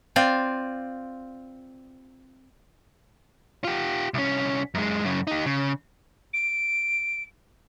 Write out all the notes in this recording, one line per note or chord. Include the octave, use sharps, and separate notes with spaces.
C4 F4 D5 F5
F4 G4
C2 C#4
F#2 G#3
F#2 C#3
D#4 G4
C#3
D7